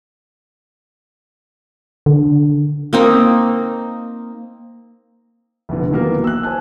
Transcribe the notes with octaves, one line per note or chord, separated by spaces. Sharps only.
D3
A#3 C4 D#4
F1 B2 D3
D#3 E3 F#3 A#3 B3 A#4
E6 F#6
C5 G#5 A5 F#6